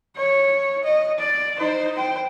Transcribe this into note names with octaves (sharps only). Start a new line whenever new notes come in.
C#5
D#5
D5
D#4 C5
C5 G5